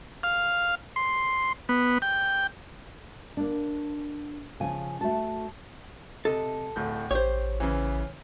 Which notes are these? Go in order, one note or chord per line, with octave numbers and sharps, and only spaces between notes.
F5
C6
B3
G5
A#3 D4
C#3 F3 G#5
A3 F#4 A5
C3 A4 D#5
D1 A2 G6
A1 G4 C5 C#5
C#3 E3